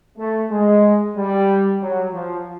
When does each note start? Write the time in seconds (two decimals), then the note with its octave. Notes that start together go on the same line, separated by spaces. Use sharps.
0.18 A3
0.50 G#3
1.16 G3
1.81 F#3
2.14 F3